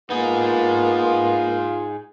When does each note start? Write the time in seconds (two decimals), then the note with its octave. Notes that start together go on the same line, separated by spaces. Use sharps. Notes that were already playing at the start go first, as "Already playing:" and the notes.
0.10 A#3 B3 D#4 F4 G#4